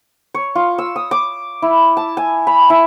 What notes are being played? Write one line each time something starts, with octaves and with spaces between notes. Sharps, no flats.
C#5
F4
E6
D#6
D6
E4
A5
G#5
B5
E4